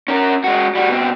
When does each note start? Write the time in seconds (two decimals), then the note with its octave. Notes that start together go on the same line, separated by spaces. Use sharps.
0.08 C#4 A#4
0.44 G#3 F#4
0.75 G3 F#4
0.89 B2 C4